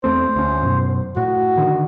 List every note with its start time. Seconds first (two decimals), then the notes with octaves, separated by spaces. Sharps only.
0.04 E2 A3 C4 C5
0.36 D2 C#4
0.63 F#2 B2
1.17 A2 F#4
1.57 D3 D#3